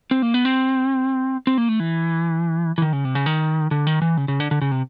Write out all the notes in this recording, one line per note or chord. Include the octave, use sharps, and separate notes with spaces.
C4
A#3
B3
C4
C4
A#3
A3
E3
E3
D#3
C#3
C3
C#3
D#3
D3
D#3
E3
C#3
C#3
D3
D3
C#3
C3